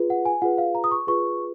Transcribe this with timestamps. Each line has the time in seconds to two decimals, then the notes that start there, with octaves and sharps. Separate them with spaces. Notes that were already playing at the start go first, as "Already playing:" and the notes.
Already playing: F4 G#4 B4
0.10 F#5
0.25 G#5
0.42 F4 G#4 B4 F#5
0.58 F5
0.75 A#5
0.84 D#6
0.91 C#6
1.07 F4 G#4 B4 C#6